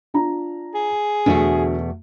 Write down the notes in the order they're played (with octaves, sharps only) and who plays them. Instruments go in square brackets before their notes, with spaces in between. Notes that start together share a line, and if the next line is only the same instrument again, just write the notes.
[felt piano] D4 F4 A#5
[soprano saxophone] G#4
[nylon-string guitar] E2 B2 A3 [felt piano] D3 F#3